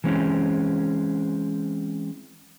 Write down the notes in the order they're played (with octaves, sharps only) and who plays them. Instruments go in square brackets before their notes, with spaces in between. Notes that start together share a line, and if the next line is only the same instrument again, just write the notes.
[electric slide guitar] E3 G#3 C4 C#4